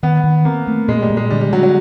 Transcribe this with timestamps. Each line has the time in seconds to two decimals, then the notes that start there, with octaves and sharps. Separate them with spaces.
0.03 D#3 B3
0.23 D#3
0.45 A#3 C4
0.67 A3
0.88 A#2 G#3
1.02 G3
1.10 A#2
1.17 G#3
1.30 D3 G3
1.41 G3
1.52 D3 F#3
1.63 F#3